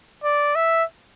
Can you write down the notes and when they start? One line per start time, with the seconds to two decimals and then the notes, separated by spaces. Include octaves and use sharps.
0.24 D5
0.55 E5